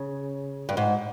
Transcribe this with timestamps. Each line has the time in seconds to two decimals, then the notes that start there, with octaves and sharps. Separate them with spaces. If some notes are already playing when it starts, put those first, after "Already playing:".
Already playing: C#3
0.69 G2
0.77 G#2